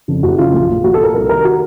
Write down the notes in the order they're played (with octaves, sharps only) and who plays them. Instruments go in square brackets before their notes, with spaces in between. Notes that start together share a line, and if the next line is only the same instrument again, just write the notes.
[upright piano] F2 C#3
F#1 F#4
F#2 C#3 F4
A#1
A#2
A#1 F#4
A4
A#2 A#4
C2 A#4
C3 D#3 A#4
F#4